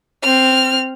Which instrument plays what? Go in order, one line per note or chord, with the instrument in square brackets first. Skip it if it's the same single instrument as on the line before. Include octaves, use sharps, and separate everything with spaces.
[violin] C4 F6